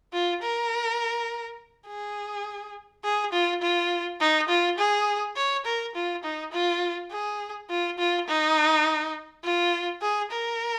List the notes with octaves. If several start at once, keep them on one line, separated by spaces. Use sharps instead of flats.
F4
A#4
G#4
G#4
F4
F4
D#4
F4
G#4
C#5
A#4
F4
D#4
F4
G#4
F4
F4
D#4
F4
G#4
A#4